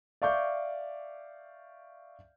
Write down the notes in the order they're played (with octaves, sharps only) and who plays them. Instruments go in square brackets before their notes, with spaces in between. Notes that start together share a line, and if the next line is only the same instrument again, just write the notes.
[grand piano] D5 E5 F5 C#6 D6 G6